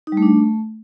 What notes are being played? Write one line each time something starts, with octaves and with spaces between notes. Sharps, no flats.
D#4
G3
A3
D4
A3